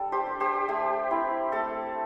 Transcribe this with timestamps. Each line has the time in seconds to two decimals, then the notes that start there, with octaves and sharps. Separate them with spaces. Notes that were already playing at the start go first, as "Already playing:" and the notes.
Already playing: G3 D4 A4
0.12 G4 C5
0.27 D4
0.40 G4 C5
0.68 A3 G4
1.11 C4 E4
1.52 A3 A4